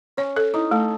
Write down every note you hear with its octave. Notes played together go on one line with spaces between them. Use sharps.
C#4 C#5
A4
D#4 E4
A3 A4